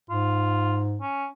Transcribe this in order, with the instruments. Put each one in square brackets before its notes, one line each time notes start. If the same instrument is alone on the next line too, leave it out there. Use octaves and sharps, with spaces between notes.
[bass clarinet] G#2 [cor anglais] F4
[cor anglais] C#4